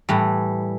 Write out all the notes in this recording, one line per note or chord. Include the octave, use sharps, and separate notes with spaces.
A2 E3 G3